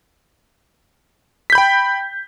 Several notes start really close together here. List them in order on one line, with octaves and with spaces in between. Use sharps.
B6 G6 B5 G5